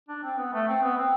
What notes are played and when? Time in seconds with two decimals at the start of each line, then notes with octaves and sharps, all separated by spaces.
0.08 D4
0.23 C4
0.38 B3
0.53 A3
0.68 C4
0.83 B3
0.97 C4